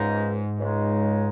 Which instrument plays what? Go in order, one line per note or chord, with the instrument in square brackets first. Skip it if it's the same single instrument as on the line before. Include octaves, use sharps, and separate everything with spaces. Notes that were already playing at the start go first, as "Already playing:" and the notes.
Already playing: [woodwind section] C#2 C#3 G#3 D#4 [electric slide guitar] G#2
[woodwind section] C#2 C#3 G#3 D#4